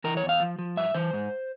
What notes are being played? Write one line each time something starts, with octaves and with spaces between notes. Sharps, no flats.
E3 A#4
C#5
E2
F5
F3
F3
G2 E5
E3 C5
G#2